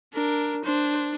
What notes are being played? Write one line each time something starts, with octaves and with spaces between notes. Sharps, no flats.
D4 A#4
D4 C5